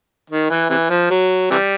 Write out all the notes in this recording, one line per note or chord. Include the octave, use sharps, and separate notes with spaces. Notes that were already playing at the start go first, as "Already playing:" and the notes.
D#3
E3
C3 E3
F3
F#3
C3 E3 G3